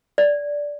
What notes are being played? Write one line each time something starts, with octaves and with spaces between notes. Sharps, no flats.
D5